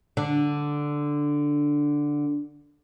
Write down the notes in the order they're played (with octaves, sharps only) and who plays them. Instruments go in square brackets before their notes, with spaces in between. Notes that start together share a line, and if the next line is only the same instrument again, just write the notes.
[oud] D3 D4